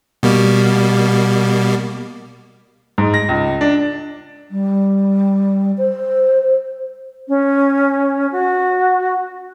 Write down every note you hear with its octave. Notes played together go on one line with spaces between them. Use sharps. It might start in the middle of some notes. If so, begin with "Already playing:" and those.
B2 G3 A#3
G#2
A#6
C#2
D4
G3
C5
C#4
F#4